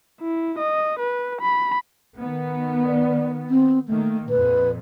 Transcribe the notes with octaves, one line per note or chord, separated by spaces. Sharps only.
E4
D#5
B4
B5
D#3 B3
D5
C4
D#3 A3 A#3
F2 A#2 B4